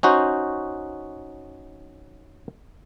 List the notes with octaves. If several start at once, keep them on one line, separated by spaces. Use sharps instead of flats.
C#4 D#4 F#4 C5